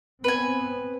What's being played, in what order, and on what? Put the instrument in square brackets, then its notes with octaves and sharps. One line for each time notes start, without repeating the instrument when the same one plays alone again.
[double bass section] B3 C4 [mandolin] B4 G#5